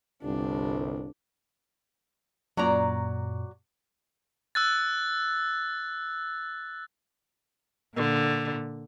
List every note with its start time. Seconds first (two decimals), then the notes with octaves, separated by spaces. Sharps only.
0.22 G1 C2 D4
2.57 F#2 A#2 F#3 D5 A#5
4.55 E6 F#6 A6
7.96 A#2 D3